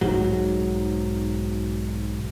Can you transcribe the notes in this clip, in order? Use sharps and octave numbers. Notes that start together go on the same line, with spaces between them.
B1 G#2 F#3